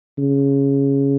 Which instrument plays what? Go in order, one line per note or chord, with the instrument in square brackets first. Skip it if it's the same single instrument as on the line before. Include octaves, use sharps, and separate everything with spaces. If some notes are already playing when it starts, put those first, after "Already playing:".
[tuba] C#3